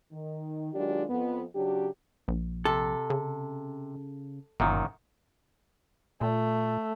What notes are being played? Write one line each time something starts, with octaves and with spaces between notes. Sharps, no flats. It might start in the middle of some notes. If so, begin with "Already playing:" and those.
D#3
D#3 F#3 G#3 D4 F4 G4
F2 B3
C#3 F#3 D4 G4
A#1
C3 A4
C#3
G1 F#2 A#2 D#3
A#2 A3